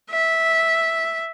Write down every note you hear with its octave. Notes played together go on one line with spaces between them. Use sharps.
E5